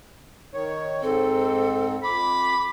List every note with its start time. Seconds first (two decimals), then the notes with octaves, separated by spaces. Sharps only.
0.54 D#3 C#5
1.03 G#2 C4 A4
2.04 F2 B5 D6